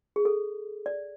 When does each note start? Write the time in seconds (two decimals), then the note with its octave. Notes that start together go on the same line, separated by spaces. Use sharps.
0.16 G#4
0.25 A4
0.86 D5